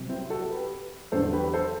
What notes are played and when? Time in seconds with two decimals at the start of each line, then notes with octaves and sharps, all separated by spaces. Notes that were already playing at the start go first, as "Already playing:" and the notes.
Already playing: C2 C3 F#3
0.09 C4 E4
0.30 F#4 A4
0.50 G4 B4
1.12 E2 D3 F#3 A4 C5
1.32 G4 B4
1.53 A4 C5